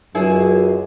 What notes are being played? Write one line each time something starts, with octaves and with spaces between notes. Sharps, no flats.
C#2 F#2 E4 G#4